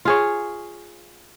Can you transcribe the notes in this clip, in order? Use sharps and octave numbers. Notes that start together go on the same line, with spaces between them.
F4 G#4 C#5